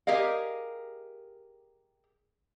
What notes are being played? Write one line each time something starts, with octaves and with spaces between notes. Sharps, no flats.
G4 G#4 A#4 D#5 F5